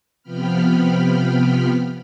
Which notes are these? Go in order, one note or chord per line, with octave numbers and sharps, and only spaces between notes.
C3 F3 B3 G5 B5 F6